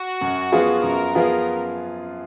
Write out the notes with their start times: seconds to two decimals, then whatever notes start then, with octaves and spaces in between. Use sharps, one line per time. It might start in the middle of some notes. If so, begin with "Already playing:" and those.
Already playing: F#4
0.21 F#2
0.52 F3 B3 F4 G#4
0.83 F#2 A#4
1.15 F3 B3 F4 G#4